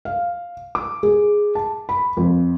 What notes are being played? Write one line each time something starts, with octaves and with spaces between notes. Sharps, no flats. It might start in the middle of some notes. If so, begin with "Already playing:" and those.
F5
D6
G#4
A5
B5
F2